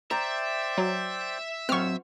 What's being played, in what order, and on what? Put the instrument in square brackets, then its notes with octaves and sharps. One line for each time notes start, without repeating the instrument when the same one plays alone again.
[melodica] C5 D5 G5 [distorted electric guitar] E5 [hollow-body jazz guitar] A#5
[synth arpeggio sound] F#3
[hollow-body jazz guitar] F#3 C4 [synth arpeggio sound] C#6 F6